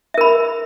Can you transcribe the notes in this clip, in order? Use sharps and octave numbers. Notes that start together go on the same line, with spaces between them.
A#4 E5 B5